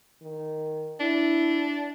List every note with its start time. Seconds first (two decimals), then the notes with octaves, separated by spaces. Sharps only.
0.22 D#3
1.00 D4 E4